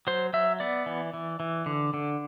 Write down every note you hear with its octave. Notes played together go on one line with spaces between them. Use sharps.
F#3 C5
F#3 E5
B3 D5
E3
E3
E3
D3
D3